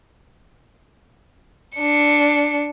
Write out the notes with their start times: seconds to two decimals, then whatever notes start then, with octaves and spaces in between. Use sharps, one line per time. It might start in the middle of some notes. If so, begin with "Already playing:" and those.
1.76 D4 C#7